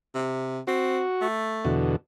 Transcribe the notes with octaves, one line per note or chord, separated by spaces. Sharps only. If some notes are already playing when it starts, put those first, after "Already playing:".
C3
C4 F#4
A3
E2 B2 D3